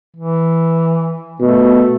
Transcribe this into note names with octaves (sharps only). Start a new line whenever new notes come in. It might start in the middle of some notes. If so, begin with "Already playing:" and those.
E3
B2 A3